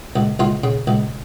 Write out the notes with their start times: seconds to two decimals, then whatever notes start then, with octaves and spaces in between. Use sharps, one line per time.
0.16 C#2
0.39 C#2 F4
0.64 C#3
0.87 C#2